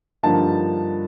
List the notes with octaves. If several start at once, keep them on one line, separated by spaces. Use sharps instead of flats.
G2 D3 F3 A#3 D#4 A5